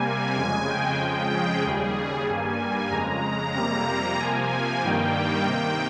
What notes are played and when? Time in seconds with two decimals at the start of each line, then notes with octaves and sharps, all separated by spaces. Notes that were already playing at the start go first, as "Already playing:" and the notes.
Already playing: C3 G3 A#3 G#5
0.35 F2 C#3 G#3
0.67 G5
0.99 F2 C#3 F3 G#3
1.31 G#4
1.63 D#2 C#3 G3
2.27 G2 G3 A#3 G#5
2.90 F2 C#3 G#3 A#5
3.54 F2 C3 G3 A#3 A#5
4.18 C3 F3 A#3 G#5
4.50 G#5
4.82 G2 D#3 G3 A#3 G5
5.45 C3 D#3 A#3 G5